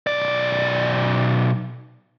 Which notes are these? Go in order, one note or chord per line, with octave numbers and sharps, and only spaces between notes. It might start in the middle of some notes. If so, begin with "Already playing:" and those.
B1 D5